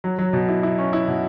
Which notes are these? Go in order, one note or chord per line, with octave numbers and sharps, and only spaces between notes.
F#3
F#3
B2
E4
E4
C#4
E4
B2